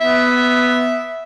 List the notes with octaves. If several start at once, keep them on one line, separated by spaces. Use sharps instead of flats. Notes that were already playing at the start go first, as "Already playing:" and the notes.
B3 E5